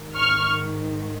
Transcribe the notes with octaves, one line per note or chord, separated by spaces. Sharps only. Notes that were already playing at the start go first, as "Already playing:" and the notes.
Already playing: G#2 D#3
C#6 F6